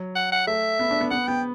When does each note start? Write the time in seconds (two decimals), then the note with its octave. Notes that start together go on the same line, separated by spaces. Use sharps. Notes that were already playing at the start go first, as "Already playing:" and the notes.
Already playing: F#3
0.16 F#5
0.32 F#5
0.47 A3 E5
0.79 B3
0.91 D4
1.01 B3
1.11 B3 F#5
1.27 B3 G5